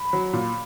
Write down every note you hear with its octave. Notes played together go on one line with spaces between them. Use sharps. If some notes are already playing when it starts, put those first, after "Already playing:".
Already playing: B5
F#3
A#2